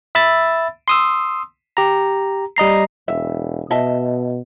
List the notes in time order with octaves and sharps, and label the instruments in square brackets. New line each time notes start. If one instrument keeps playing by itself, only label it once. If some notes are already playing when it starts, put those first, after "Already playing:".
[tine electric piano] E5 B5 E6 A6
C6 D#6 E6
G4 A#5
G3 D#5 A#5 C7
[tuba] E1 [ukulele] E5
[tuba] B2 [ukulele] D#5 E5 A5